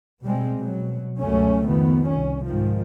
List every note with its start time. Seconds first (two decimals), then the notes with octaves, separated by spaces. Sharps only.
0.22 B2 G3 G#3 C4
0.56 B2 F#3
1.19 C#2 F#2 B2 A3 C#4
1.63 F2 D#3 B3
2.08 C2 C#4
2.46 G#2 D#3 F3